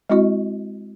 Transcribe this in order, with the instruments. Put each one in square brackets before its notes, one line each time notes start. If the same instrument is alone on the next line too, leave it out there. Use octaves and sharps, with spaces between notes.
[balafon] G#3 C4 E4 F#4 D#5